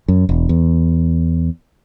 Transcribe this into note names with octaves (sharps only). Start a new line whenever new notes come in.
F#2
E1
E2